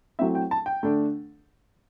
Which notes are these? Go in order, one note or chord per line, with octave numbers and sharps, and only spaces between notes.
F#3 A3 C4 E4 E5
G5
A5
G5
D3 A3 D4